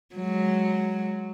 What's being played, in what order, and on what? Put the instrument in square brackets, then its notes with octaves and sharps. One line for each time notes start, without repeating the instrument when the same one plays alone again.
[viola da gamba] F#3 G#3